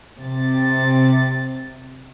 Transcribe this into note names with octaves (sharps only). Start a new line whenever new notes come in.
C3 A6